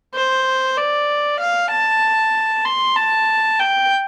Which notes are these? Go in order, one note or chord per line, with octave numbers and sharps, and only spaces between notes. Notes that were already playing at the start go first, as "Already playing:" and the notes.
C5
D5
F5
A5
C6
A5
G5